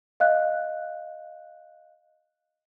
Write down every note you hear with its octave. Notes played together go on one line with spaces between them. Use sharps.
D#5 F5 F#6